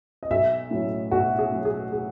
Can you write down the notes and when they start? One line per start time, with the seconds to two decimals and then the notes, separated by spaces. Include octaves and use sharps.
0.23 D#5
0.30 B1 E5
0.71 A2 F#3 C#4
1.11 B1 F#4
1.39 G#4
1.52 A2 F#3 C#4
1.65 G#4
1.92 G#4